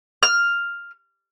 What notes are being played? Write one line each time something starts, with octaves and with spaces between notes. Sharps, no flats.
F6